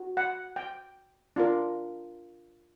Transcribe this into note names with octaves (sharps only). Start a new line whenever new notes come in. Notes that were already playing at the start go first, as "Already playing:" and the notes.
Already playing: F#4
F#5
G5
D4 F4 A#4